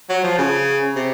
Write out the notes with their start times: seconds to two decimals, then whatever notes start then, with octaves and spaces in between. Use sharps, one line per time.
0.09 F#3
0.24 F3
0.38 C#3
0.95 C3